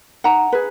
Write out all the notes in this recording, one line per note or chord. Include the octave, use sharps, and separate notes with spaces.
D#4 F#5 A#5
G#4 B4